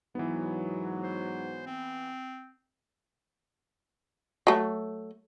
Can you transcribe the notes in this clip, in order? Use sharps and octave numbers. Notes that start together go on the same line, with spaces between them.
G#2 E3 F#3 B3
C5
C4
F#3 A3